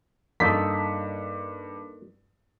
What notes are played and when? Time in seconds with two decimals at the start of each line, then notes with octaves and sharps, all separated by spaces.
0.40 G2 A#3 D#4 A4 C6 B6